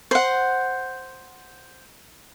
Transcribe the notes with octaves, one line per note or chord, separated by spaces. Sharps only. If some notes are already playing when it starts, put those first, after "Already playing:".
C5 F#5